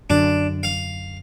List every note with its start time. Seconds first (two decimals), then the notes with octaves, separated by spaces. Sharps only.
0.10 F#2 D3 D4
0.63 F5